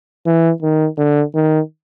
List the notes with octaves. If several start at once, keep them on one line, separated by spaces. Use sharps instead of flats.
E3
D#3
D3
D#3